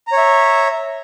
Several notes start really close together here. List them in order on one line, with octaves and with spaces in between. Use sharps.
A#5 C#5 E5